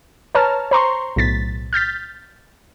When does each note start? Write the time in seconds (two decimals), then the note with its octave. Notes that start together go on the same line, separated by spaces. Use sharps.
0.35 B4 C#5 A5 A#5 F6
0.71 C5 A#5 C6 C#6
1.16 B1 A2 A6 B6
1.73 F6 G6 A6 B6